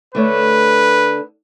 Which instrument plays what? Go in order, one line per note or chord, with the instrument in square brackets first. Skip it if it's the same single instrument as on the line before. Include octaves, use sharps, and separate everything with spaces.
[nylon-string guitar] D3 A3 C#5 [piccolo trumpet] B4